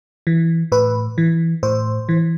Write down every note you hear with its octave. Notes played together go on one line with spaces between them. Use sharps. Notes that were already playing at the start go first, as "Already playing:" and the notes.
E3
A2 B4
E3
A2 C5
E3